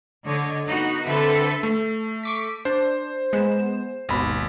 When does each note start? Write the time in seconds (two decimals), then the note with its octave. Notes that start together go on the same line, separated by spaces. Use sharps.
0.24 D3 C#5 D#5
0.67 B3 D#4 F#4
1.04 D3 C4 A4 B4 E5
1.63 A3
2.23 C#6 D6 B6
2.65 D4 C5
3.33 G#3 B3 E7
4.09 G#1 D#2 B2 B5